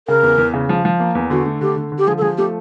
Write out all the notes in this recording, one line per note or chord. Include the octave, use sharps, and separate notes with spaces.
C#3 A#4
E2
E2
C#3
F3
F3
A#3
E2
D3 F#4
A3
D3 G4
D3
D3
G4
F3 G#4
A4
F3 G#4
A3 G4